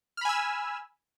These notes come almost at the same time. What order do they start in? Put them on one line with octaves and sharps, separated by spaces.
F6 B5 G#5 E6